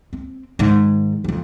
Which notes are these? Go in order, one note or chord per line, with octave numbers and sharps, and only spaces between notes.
C4
G#2 D#3
F2 E3